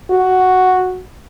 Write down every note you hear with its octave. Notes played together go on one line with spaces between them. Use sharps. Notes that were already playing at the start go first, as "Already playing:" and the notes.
F#4